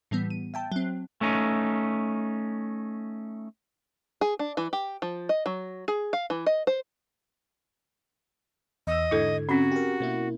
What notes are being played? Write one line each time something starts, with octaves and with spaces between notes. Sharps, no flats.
A2 E3 G3 B3
D#7
E5 G5 A5
F#3 C4
A3 C#4 D#4
G#4
D4
E3
G4
F3
D#5
F#3
G#4
F5
E3
D#5
C5
E2 D#5 E6
G#2 D3 E4 A4 G#6
C4 C#4 F#4
G4 A#4
B2 A#3 E4